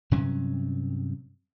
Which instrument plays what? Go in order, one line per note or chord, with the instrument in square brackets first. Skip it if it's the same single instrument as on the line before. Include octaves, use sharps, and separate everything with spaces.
[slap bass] G2 C3 F#3 C#4